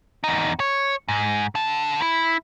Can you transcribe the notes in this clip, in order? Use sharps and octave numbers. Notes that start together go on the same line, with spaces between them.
E2 D#4
C#5
G#2
D3 A5
E4